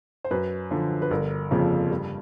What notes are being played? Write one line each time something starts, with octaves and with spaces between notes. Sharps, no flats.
C5
F#2 B4
D3 F3
B4
G1 A#4
F2 C#3 F3 A#3
G2